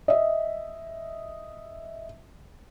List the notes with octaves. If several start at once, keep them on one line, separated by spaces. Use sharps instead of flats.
D#5 E5